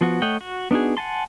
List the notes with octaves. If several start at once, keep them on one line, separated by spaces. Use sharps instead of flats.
F3 B3 F#4
A3 C#5 D#5 F#5 G5
F#4
B3 D4 D#4 F#4 G#4
F#5 G#5 A5 C6